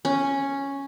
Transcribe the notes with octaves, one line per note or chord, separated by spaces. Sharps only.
C#4